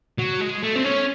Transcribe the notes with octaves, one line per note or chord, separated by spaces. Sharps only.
F#3
G#3
A3
C4
C#4